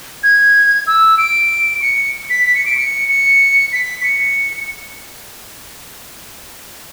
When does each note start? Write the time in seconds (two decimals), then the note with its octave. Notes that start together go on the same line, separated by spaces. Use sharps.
0.23 G#6
0.87 E6
1.18 D7
1.82 C#7
2.30 B6
2.46 B6
2.55 C#7
2.66 D7
2.78 C#7
3.09 C#7
3.73 B6
4.04 C#7